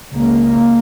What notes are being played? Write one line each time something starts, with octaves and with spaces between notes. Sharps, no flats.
C#2 C#3 A#3